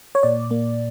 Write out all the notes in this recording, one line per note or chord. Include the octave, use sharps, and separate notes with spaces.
C#5
A#2 D5
A#3